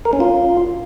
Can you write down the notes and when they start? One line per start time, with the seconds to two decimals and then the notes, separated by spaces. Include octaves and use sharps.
0.05 A#4
0.13 C#4
0.20 F4